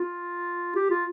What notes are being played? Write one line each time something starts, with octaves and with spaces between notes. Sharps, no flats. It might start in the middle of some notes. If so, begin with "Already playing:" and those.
Already playing: F4
G4
F4